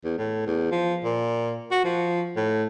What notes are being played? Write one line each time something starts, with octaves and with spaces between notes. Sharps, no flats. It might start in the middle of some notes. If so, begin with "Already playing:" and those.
E2
A2
E2
F3
A#2
F#4
F3
A2